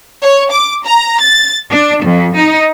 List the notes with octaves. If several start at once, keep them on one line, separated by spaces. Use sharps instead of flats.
C#5
D6
A#5
A6
D4
F2
D#4